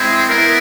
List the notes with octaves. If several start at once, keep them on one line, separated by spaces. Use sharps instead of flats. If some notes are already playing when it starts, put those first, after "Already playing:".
Already playing: G#3 C4 E4
B3 E4 A#4